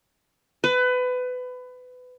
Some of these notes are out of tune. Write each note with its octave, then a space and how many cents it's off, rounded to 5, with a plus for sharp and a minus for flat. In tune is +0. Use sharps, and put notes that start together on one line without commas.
B4 +25